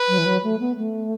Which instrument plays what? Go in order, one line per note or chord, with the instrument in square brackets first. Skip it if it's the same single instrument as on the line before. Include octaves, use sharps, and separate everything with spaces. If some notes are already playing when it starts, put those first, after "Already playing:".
Already playing: [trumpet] B4
[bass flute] F#3
E3
F#3
A3
B3
A3